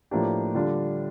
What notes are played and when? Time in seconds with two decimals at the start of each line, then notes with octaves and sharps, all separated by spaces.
0.11 A2 F3 A#3 D4 G4
0.55 D3 G3 D4 F4